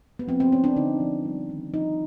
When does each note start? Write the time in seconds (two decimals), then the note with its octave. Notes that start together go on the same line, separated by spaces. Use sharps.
0.19 B3
0.27 F3 C4
0.40 C4
0.52 A#3 C#4
0.64 D4
0.76 D3 D#4
1.00 F3
1.25 G3
1.50 D#3
1.74 F3 D#4